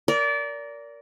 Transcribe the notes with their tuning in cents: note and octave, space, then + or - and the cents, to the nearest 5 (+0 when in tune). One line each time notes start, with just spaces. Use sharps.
A#4 +0 D5 -25